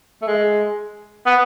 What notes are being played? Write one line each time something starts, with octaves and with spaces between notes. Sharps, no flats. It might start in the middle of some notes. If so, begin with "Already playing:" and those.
A3
G#3
B3